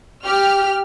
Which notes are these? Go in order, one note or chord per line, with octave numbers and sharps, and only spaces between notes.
G4 F6